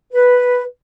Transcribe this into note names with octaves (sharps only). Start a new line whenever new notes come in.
B4